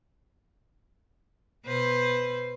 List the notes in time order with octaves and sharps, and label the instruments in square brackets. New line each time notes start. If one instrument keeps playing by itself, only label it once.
[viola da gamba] B2 B4 C5